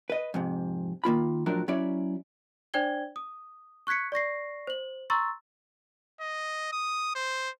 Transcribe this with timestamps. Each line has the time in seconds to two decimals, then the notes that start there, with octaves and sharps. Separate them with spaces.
0.10 B4 D#5
0.34 F2 G#2 C3
1.04 D#3 A#3 F4 B5
1.46 A2 F3 F#3 D4 A#4
1.68 F#3 C#4 E4 C#5 D5
2.74 D4 C5 D5 G5 G#6 G7
3.16 D#6
3.87 C#6 F#6 G#6 B6 C#7
4.12 D5 C#6 A#6 C7
4.67 C5 F#7
5.10 A#5 C6 C#6 E6 A6
6.21 D#5
6.72 D#6
7.15 C5